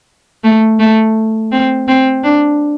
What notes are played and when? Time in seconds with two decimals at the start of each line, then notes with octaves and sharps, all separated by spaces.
0.44 A3
0.80 A3
1.52 C4
1.88 C4
2.24 D4